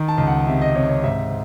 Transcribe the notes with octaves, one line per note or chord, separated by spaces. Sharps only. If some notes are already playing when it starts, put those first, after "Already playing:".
Already playing: D#3
A5
C#2
F#5
C3 E5
D#5
C3 C#5
C#5
G#2 E5